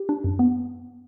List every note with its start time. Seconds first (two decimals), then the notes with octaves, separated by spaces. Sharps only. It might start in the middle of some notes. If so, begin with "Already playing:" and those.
Already playing: G4
0.09 D4
0.24 F#2
0.39 B3